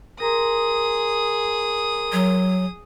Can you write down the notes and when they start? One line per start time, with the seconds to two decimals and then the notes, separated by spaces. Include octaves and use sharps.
0.20 G#4 A#4 A#5 C6 D#6
2.12 F#3